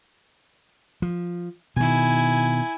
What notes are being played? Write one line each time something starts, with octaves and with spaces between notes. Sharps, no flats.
F3
B2 D#3 E4 G#5